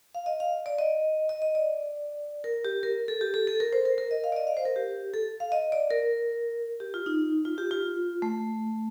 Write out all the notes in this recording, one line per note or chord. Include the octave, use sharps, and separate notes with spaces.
F5
D#5
F5
D5
D#5
D#5
D#5
D5
A#4
G4
A#4
A4
G4
A4
A4
A#4
C5
A#4
A#4
D#5
F5
D5
D#5
F5
C5
A#4
G4
A4
F5
D#5
D5
A#4
G4
F4
D#4
F4
G4
F4
A3